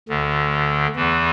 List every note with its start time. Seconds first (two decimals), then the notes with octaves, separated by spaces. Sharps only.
0.08 D2 D3
0.96 E2 E3